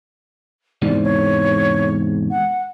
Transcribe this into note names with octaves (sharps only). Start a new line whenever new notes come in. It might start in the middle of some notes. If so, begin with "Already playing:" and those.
E2 G#2 C3 D5
C#5
F#5